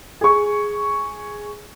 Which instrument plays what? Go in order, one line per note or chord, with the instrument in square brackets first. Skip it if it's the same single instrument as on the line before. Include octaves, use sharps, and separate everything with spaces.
[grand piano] G#4 C#6